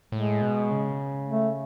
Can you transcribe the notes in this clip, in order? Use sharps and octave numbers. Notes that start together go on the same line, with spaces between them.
A2 G#3
B2
C#3
A3